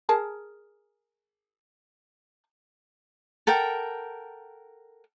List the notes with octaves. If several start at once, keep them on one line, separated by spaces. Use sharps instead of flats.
G#4 A#4 A5
A4 A#4 F#5 G5